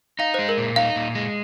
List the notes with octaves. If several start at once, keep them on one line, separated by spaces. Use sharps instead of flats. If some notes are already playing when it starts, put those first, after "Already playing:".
D#4 F5
G#3 C5
A#4
A#2
D#4 F5
A#2
G#3